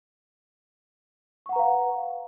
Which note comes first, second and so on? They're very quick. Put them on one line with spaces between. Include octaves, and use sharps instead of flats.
C#6 F#5 A#5 B4 F5